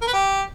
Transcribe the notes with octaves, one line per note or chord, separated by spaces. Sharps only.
A#4
B4
G4